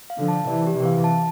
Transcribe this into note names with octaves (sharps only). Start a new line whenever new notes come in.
F5
D3 F3
A5
C3 E3 D5
G4
C3 E3
F5
A5